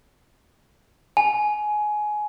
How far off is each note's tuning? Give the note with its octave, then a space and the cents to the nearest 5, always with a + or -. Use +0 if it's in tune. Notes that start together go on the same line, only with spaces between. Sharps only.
G#5 +20